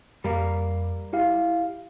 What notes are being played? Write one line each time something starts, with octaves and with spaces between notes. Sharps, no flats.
F2 G3 A#3
E4 G4 F5